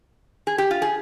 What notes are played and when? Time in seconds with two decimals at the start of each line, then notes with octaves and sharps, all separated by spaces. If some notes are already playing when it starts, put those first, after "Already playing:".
0.47 G#4
0.58 G4
0.71 F4
0.82 G#4